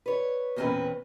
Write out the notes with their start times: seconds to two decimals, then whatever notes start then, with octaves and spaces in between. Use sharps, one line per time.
0.06 B4 C#5
0.56 E2 A#2 A#3 C4 C#4 B4